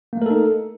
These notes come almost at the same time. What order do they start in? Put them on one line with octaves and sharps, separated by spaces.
A#3 A3 A#4 A4 D#4